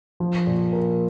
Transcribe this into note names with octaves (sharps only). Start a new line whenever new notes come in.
F3
A#2
A#4